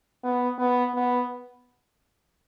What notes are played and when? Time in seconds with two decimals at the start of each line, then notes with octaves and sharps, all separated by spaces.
0.24 B3
0.59 B3
0.95 B3